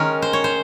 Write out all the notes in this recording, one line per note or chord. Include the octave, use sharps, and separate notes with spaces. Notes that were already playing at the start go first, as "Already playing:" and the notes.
Already playing: D#3 G#3 C#4 A#4
C5
C#5
C5